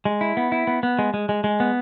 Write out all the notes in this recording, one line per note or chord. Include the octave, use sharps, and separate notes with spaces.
G#3
E4
B3
E4
B3
B3
G#3
G#3
G#3
G#3
B3